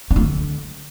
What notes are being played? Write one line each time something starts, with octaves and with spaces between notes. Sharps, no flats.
D4
A3
D3